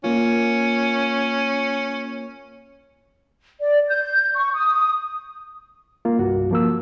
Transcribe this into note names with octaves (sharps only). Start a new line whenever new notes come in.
A#3 C#4 F4
D5
G6
C#6
D#6
A#3 F4
C2 G2 F#4
F3 A#3 E6